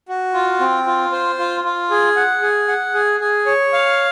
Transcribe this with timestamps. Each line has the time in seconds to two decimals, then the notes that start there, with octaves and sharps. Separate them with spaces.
0.09 F#4
0.34 F4
0.60 C4
0.86 F4
1.12 C5
1.39 F4
1.64 F4
1.91 G#4
2.16 F#5
2.42 G#4
2.68 F#5
2.94 G#4
3.20 G#4
3.46 C#5
3.73 F5